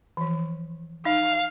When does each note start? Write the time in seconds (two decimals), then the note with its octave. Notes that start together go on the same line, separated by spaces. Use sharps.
0.17 E3 F3
1.05 D#4 F5